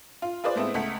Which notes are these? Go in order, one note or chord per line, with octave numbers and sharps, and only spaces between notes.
F4
F4 G#4 B4 C5 D5
G#3 A3 B3 C4 E4
C#2 A3 F#5 B6